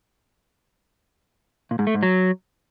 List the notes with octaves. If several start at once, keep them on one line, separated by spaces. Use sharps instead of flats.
A#2
G#2
A3
G#2
F#3